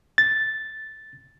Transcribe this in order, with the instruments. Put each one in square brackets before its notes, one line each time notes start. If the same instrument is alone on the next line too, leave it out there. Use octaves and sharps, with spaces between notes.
[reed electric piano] A6